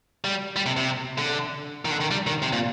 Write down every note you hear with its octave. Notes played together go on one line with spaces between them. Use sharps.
G3
G3
C3
C3
D3
D#3
D3
D#3
G3
D#3
C3
A#2